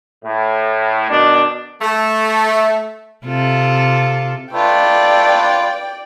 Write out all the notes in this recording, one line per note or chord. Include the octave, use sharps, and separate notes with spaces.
A2
B2 D#3 D4
A3
C3 F4 A4
A3 F4 B4 D5 G5